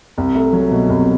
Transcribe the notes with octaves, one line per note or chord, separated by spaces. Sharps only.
C2
A3
F#3
B2
C2